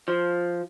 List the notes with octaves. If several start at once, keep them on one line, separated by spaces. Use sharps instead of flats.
F3